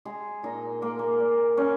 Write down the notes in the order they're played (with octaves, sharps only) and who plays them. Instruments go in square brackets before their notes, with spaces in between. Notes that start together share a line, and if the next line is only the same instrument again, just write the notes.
[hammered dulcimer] G#3 G#4
A#2 D#4
G#3 A#3
A#3
A#2
G#3 C#4